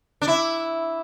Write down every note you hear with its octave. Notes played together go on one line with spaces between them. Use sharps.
D4
E4